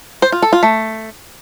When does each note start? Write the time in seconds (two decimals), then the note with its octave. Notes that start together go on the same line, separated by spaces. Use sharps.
0.22 C5
0.32 F4
0.42 A4
0.53 F4
0.63 A3